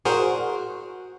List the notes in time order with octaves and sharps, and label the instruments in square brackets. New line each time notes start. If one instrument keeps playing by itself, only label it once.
[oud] F#4 [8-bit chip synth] G#4 A#4 C5